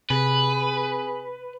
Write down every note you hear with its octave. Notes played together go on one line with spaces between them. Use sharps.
C3 G#4 B4